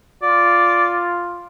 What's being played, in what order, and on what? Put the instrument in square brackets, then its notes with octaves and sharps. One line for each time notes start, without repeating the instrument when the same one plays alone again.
[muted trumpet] F4 [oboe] D5